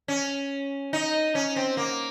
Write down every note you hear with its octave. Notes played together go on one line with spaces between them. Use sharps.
C#4
D#4
C#4
C4
A#3